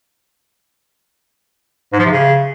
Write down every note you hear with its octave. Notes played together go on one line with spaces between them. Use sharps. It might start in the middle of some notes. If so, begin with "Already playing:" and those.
G#2
F3
C3
C#3